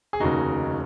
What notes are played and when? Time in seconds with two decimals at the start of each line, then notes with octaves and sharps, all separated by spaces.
0.13 G#4
0.20 F1 D#2 C#3 D#4 F#4